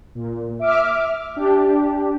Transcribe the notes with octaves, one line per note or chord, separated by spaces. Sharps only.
A#2
E5 D6 F6
D4 G4